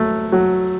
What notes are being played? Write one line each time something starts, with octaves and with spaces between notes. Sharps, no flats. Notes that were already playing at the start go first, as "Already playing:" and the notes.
Already playing: F#3 A3
F#3